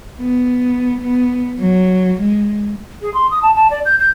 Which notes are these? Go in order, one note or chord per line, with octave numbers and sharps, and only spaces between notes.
B3
B3
F#3
G#3
G#4
C6
D#6
A5
A5
D5
G6
G6